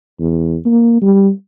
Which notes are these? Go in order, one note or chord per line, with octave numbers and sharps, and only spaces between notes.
E2
A#3
G3